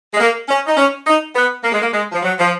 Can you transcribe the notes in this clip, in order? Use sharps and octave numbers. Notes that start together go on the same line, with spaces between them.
G#3
A#3
C#4
D#4
C#4
D#4
B3
A#3
G#3
A#3
G#3
F3
F#3
F3